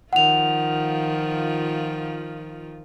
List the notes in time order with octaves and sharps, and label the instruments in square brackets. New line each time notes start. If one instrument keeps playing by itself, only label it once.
[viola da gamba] D#3 F3 F4 [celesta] F#5 F7